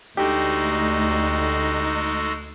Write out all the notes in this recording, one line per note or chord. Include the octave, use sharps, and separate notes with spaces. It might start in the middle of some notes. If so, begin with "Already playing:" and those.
D2 G#3 D#4 F#4 G4 A4